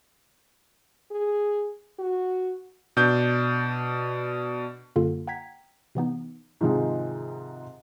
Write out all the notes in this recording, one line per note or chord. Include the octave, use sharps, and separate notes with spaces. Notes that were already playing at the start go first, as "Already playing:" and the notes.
G#4
F#4
B2 D4 G6
F#2 D3 A#3 F4 A4
F#5 G5 A#5 G#6 B6
C3 E3 B3 D#4
G#2 C3 D#3 F3 G#3 D#4